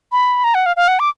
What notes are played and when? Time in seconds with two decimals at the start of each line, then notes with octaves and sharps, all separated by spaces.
0.12 B5
0.44 A#5
0.55 F#5
0.66 F5
0.76 F5
0.88 F#5
0.99 D6